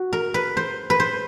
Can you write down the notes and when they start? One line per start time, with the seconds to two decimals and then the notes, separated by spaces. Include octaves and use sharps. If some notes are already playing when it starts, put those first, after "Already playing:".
Already playing: F#4
0.13 A#4
0.34 B4
0.57 C5
0.90 B4
1.00 C5